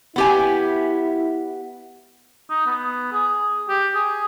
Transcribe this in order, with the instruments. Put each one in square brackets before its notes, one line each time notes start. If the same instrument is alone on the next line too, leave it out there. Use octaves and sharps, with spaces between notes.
[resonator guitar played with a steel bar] B3 G4 G#5 [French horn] E4
[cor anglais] D#4
B3
G#4
G4
G#4